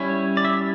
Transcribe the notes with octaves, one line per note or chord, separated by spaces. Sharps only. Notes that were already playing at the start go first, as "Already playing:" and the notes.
Already playing: G3 C#4 E4 C#5
D5
E5